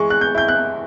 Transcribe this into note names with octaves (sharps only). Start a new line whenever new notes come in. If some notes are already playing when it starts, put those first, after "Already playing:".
Already playing: E3 G#3 C#6
F#6
G6
E4 G6
F#6